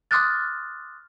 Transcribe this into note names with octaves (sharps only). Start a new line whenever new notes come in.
C6 D6 D#6 F6 F#6 A6